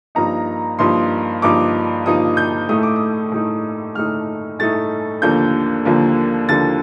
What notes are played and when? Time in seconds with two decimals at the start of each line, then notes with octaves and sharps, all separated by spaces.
0.15 G2 F3 A#3 D#4 A#5
0.79 G2 F3 A#3 D#4 C6
1.42 G2 F3 A#3 D#4 D6
2.06 G2 F3 A#3 D#4 D#6
2.37 G6
2.69 A2 A3 D#4 D#6
2.83 D6
2.96 D#6
3.32 A2 A3 D#4
3.95 A2 A3 D#4 F6
4.59 A2 A3 D#4 A6
5.22 D#2 D3 F3 A#3 G6
5.85 D#2 D3 F3 A#3
6.49 D#2 D3 F3 A#3 A6